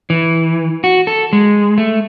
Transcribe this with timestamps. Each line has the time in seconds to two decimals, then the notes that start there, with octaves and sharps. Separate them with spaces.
0.10 E3
0.84 F#4
1.07 A4
1.33 G#3
1.78 A3